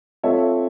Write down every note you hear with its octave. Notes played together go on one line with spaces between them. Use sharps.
C4 F4 A4 C#5 E5